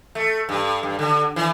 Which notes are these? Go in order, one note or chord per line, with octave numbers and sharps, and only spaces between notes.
A3
G2
G2
D3
E3